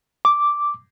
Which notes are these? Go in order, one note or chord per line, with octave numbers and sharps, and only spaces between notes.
D6